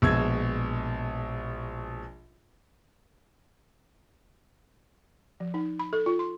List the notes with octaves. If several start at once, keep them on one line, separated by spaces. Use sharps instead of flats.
A#1 B2 G#3 E6 G#6
F3
D#4
B5
A4
F4
C6